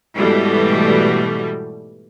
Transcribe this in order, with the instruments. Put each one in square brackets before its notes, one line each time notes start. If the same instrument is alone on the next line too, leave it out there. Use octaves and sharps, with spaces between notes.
[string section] G#2 B2 E3 G3 A3